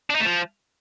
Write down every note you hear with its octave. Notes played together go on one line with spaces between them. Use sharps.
D4
D#4
A3
F3